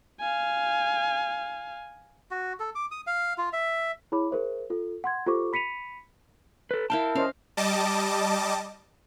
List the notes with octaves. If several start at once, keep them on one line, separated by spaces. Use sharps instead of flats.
F5 G#5
F#4
A4
D6
D#6
F5
F4
E5
E4 G#4 C#5 B5 D6
G#4 A#4 C5 E5
F4 A4
F#5 C6 G#6
F4 G4 A4 C5 C#6 D6
B5 B6 C#7 D#7 F7
A4 B4
E4 A#4 F5 G5 A5
C#4 C5 D#5 F5
G3 D#5 A5 D6